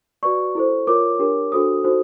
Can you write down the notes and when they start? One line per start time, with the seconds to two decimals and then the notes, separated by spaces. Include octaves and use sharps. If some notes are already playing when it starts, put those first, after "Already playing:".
0.23 F#4 B4 D5 C#6
0.55 E4 A4 C5
0.87 F4 A#4 C#5 D6
1.19 D4 G4 A#4 C#5
1.52 D4 F#4 A4 C5 D#6
1.84 D#4 F#4 A4 C5